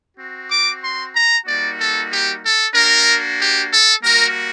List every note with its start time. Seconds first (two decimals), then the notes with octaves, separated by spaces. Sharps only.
0.17 C4 F#4
0.49 D6
0.83 C6
1.15 A#5
1.45 G3 A#3 D#4 F#4 D5
1.78 A4
2.10 G4
2.43 A4
2.74 A#3 D4 F#4 A#4
3.39 G4
3.71 A4
4.02 G3 A#3 F#4 A#4